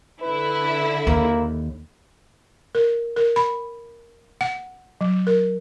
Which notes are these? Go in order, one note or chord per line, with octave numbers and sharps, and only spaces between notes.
D3 E4 B4
D#2 A#3
A#4
A#4
B5
F#5
F#3
A#4